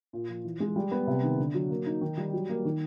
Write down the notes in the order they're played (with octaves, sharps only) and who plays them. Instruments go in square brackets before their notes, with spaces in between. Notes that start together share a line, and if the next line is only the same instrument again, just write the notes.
[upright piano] A#2
F3
E3
G#3
G3
B3
C3
D#3
D3
F#3
A#3
D#4
D#3
G3
F#3
A#3
D#3